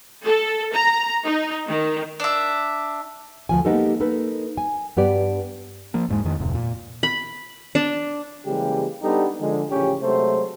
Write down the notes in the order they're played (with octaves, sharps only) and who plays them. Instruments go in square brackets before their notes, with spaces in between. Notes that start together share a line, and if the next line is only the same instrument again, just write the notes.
[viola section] A4
A#5
D#4
D#3
[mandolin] D4 E5
[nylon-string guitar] D2 F3 G#5
G#3 A#3 B3 D#4 G4 A4
A#3 D#4 A4 B4
G#5
G2 B3 G4 D5
[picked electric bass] F3 A#3
E1 G#2 G#3
F2 D#3
D1 F2 C3
A#2
[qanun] B5
D4
[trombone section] C#3 E3 G3 G#3 A#3 G4
G3 B3 D4 D#4 G4 A4
D3 F3 G#3
A1 C#3 F3 C#4 G4
C3 F#3 G#3 A3 C5